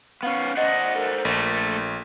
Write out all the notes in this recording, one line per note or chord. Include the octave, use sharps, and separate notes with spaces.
B3 C#4 F5
C5 D5 D#5 F#5
A4 A#4
A#1 A3